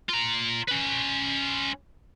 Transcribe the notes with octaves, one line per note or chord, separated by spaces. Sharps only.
F4 A#5
C#4 B4